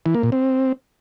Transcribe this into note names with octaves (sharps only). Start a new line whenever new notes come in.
E3
A#3
A#2
C4